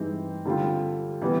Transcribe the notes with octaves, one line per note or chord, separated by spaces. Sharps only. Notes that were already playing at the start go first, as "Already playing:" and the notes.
Already playing: G2 E3 G#3 C4 D#4
D3 G3 C4 F4
E3 G3 B3